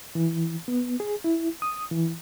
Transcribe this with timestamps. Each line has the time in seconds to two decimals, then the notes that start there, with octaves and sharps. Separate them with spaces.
0.15 E3
0.68 B3
1.00 G#4
1.24 E4
1.62 D#6
1.91 E3